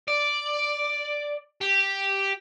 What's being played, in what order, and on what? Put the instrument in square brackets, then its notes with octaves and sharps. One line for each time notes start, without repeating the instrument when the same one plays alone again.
[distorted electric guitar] D5
G4